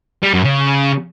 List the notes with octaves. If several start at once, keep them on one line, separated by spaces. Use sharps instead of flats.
G3
F#2
C#3